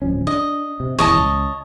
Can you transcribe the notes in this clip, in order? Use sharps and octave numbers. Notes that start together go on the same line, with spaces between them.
D1 F3 C#4
D4 D#5
C3
D#1 E2 E3 C#5 D#5 A5
C#2